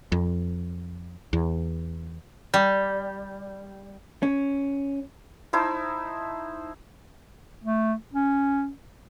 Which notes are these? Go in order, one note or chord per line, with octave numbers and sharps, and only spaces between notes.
F2
E2
G3
C#4
D#4 E4 C5 A5
A3
C#4